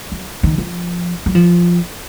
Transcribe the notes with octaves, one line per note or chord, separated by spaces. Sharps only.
F#3
D#3
F3
F#3
F3